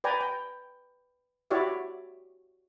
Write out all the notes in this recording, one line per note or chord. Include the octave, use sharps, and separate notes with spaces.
B4 D5 G5 G#5 A#5
G5
E4 F#4 G4 C#5 D5 E5